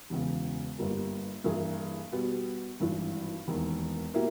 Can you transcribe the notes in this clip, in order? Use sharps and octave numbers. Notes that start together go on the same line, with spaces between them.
E1 E2 C#3
G1 G2 G3 A#3
G2 E3 A#3 E4 G#4
B2 G3 B3
G#1 G2 E3
E1 D#2 D#3
B2 A#3 E4 G4